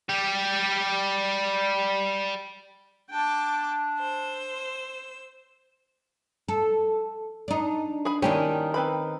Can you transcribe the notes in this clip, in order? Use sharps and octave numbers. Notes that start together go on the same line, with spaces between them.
G3 G4
D4 G5 A5 D6
C5 E6
A4
D4 D#4
G#4 B5
D#3 A#3 C#4 D4 E4 G4
C4 B4 B5